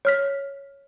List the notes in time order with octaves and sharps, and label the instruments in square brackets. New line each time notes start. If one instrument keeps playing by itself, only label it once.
[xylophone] C#5 F6 B6